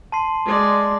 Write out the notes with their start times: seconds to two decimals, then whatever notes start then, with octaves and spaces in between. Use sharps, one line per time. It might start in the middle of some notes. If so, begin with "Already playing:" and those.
0.12 A5 C6 C7
0.45 G#3 D5